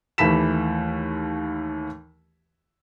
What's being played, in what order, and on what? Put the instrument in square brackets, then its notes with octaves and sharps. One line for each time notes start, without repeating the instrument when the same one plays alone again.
[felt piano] D#2 E3 A3 B5 B6 E7